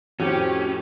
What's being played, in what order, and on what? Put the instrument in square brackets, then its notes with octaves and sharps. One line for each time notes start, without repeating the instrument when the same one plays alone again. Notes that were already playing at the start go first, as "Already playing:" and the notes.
[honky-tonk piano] F2 A2 [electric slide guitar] C#4 [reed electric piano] F#4 [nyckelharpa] G4 C5